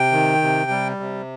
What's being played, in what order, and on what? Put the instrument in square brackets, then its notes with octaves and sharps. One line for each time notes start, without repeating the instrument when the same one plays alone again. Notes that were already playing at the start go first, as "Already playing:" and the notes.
Already playing: [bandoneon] C3 G5
D#3
C3
G3
C3